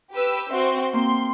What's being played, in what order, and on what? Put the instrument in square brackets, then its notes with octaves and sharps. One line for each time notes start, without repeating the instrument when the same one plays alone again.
[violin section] G4 B4 E6
[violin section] C4 F#4 C6 [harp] E5
[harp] A#3 C4 [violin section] C6